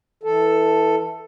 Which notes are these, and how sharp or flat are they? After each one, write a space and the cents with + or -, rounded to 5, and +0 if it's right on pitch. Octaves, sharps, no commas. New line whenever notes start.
E3 -15 A4 +0